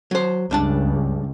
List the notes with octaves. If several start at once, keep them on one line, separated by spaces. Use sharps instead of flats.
F#3 C5
C#2 G2 D4 A5